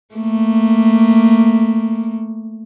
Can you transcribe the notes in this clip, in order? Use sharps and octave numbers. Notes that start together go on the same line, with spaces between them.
A3 A#3